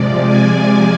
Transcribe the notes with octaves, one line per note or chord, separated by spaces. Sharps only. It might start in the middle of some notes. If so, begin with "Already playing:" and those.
Already playing: C3 F3 G#3 D5
G#5